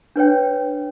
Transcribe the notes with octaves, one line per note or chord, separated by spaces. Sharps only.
D4 B4 C#5 G5